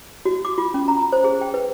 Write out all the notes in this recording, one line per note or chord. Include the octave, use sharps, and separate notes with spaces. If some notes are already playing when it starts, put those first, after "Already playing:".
F#4
D6
F4
C#4
A#5
C5
G#4
G5
B4